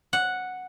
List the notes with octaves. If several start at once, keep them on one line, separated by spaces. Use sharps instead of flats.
F#5